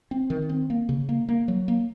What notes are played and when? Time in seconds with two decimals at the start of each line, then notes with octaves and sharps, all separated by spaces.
0.11 C4
0.30 D#3
0.49 C4
0.70 A#3
0.89 C#3
1.09 A#3
1.29 A#3
1.48 F#3
1.68 A#3